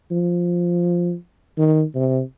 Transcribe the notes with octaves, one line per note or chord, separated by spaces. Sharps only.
F3
D#3
C3